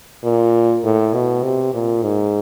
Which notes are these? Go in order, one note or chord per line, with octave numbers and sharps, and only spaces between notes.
A#2
A2
B2
C3
A#2
G#2